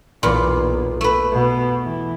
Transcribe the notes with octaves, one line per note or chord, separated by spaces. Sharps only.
B1 E2 A#2 F4
A3 B4
B2
E3